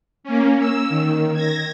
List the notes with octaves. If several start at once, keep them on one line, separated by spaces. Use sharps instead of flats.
A#3 C#4
E6
D#3
G#6 A#6